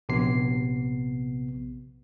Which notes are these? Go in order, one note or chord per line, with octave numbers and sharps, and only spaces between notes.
A#1 C3 B3 C7